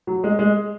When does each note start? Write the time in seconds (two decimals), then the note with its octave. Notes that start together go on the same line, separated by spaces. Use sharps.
0.07 F#3
0.24 G#3
0.39 G#3